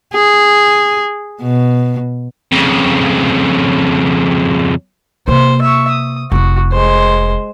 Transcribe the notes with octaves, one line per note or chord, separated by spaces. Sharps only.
G#4
B2
F2 C#3
C3 A#3 C5
E5 C#6
D#6
F1 E4 F#4
G#3 C5